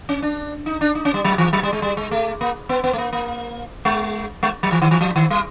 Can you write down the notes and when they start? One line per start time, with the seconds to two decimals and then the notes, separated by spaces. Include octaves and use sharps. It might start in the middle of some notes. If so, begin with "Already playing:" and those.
0.09 C#4
0.22 D4
0.66 D#4
0.81 D4
0.95 D#4
1.05 C#4
1.14 G3
1.24 F#3
1.38 E3
1.53 F#3
1.63 G3
1.73 G#3
1.82 G3
1.97 G#3
2.11 A3
2.41 A#3
2.69 B3
2.84 B3
2.93 A3
2.98 A#3
3.13 A#3
3.85 G#3
4.43 G#3
4.63 F#3
4.72 E3
4.82 D#3
4.91 E3
5.01 F3
5.16 D#3
5.30 G3